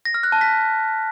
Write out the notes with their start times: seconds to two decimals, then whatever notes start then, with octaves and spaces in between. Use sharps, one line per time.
0.05 A#6
0.14 F6
0.23 F#6
0.32 A5
0.41 B6